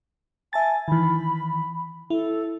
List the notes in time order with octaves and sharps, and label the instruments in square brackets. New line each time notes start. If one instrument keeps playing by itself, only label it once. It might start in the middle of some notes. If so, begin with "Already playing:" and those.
[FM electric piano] E5 A5 A6 [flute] G#5
[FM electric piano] D#3 E3 [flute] B5
[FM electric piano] E4 [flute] A4